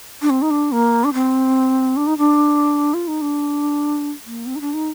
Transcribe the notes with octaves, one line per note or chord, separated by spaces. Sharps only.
D4
C4
D#4
D4
A#3
D4
C4
D4
D#4
D4
F4
D#4
D4
A#3
C4
D#4
D4
D#4